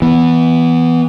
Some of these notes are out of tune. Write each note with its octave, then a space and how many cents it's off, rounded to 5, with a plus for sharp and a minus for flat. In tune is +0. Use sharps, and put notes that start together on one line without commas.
E3 -10 B3 +0